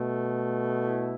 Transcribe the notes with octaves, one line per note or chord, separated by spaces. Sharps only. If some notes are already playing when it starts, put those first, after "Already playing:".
Already playing: B2 A3
E4